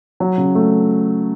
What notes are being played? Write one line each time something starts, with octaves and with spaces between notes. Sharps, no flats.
F#3
C#3
A3